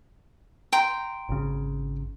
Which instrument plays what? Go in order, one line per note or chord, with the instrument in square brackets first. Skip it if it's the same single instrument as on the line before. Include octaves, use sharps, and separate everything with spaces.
[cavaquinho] G5 A#5 C6
[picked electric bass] G#1 C#3